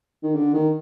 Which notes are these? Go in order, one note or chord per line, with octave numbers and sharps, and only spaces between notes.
D#3
D3
D#3